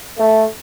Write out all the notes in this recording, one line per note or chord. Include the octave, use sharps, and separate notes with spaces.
A3